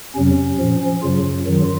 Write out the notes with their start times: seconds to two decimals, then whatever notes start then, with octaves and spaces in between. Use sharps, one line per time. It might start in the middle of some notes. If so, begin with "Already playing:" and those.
0.15 F2 C3 F#3 C#4
0.59 A#2 F3
1.02 F#2 C#3 F#3 F4
1.46 F#2 D#3 F#3